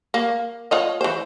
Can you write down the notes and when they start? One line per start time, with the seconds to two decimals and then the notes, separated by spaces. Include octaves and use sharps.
0.14 A#3
0.71 F4 C#5 D#5
1.01 E3 C5